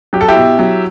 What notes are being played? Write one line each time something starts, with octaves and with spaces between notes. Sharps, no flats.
F#3 G4
A4
E4 G4
B2
F#3